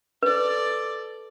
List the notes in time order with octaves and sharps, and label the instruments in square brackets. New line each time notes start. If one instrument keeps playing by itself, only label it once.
[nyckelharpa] A4 D5 [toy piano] B4